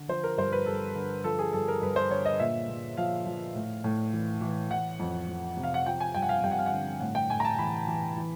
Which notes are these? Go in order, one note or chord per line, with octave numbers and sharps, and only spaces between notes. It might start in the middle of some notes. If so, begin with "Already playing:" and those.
Already playing: D3
F3 C5
A#4
G2 C5
B4
G2 A4
D3
F3 A4
G#4
G2 A4
A#4
G2 B4
C5
D3 C#5
D#5
A#2 E5
A#2
F3 F5
F3
A2
A2
E3
E3
E3 F#5
F2
F2
C3
F5
F#5
F3 G5
G#5
G2 G5
F#5
F5
G2 G5
F#5
F5
F#5
D3
A2 F#5
G5
A2 G#5
A#5
A5
E3 B5
E3
E3